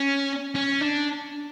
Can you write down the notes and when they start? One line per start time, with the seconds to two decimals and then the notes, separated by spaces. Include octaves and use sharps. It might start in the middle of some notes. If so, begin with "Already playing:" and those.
Already playing: C#4
0.55 C#4
0.81 D4